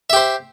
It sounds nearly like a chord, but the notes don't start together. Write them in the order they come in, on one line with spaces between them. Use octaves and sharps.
E5 G4 C5